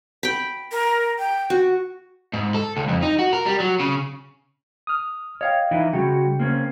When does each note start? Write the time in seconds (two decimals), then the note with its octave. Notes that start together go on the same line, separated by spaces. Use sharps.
0.23 G5 B5
0.72 A#4
1.19 G5
1.50 F#4
2.33 G#2
2.54 A4
2.77 C#2
2.89 F2
3.02 D#4
3.19 F#4
3.33 A#4
3.46 G3
3.60 F#3
3.80 C#3
4.87 D#6 F6
5.41 C#5 D#5 F5 G5
5.71 E3 D#4 E4
5.93 C#3 G3 G#3 F#4 G5
6.40 A#3 C4 C#4